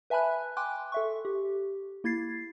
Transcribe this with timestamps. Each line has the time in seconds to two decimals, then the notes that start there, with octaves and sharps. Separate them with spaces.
0.10 B4 E5 G#5 A5 B5 F#6
0.57 G5 G#5 C6 D6 F#6
0.92 A4 E5 C#6
1.25 G4
2.04 A#3 E4 G#6 A6 C7